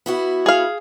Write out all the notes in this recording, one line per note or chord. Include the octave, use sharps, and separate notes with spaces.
B3 E4 F#4
G#4 F5